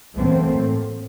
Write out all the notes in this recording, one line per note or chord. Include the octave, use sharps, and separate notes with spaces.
E3 F#3 A3 A#3 C4
A2